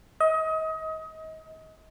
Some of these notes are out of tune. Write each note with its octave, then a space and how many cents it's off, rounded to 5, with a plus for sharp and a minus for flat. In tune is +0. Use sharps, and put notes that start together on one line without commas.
D#5 +30